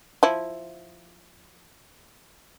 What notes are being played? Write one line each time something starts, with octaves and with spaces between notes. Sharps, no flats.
F3 E4